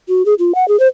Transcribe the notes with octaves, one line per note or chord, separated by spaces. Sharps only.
F#4
G#4
F4
F#5
G#4
C5